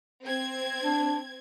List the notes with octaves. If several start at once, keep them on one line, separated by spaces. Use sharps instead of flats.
C4 G#6
D4